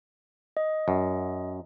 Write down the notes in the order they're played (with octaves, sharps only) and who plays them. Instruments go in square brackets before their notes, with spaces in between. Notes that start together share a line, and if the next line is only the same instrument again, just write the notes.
[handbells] D#5
[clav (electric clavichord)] F#2